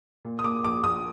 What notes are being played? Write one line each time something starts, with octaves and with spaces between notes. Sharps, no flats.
A#2
D#6
A#2 D6
A#1 D6
A#1 D#6